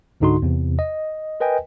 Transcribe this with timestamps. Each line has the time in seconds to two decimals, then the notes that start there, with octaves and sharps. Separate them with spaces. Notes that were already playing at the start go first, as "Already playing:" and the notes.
0.20 C#2 G#2 D3 D#4 F#4 C6
0.42 E2 C3
0.79 D#5
1.40 A#4 B4 D#5 G5 G#5